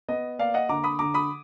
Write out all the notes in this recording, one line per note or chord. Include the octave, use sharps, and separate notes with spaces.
B3 D#5
A#3 D5 F5
D#5 F#5
D3 A#5 D6
B5 D#6
D3 A#5 D6
B5 D#6